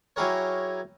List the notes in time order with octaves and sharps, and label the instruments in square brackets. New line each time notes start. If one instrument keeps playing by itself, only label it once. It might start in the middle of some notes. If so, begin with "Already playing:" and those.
[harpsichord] F#3 E4 G4 G#4 A#4 C#5